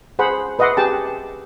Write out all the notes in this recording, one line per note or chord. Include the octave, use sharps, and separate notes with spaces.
G#4 C5 F#5 B5
B4 D#5 E5 F#5 C6 D6
G4 G#4 G5 A5